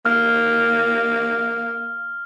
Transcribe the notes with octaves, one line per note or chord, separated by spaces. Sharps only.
A#3 F6